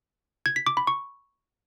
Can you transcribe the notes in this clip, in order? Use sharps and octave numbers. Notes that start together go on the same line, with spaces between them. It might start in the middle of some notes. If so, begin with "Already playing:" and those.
G#6
B6
D6
B5
C#6